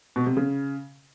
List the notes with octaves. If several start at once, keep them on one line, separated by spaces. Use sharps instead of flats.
B2
C3
C#3